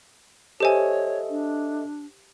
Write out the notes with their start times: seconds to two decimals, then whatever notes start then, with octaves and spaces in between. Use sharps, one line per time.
0.60 G4 A4 C5 C#5 D#5 E5 G#5
1.30 D4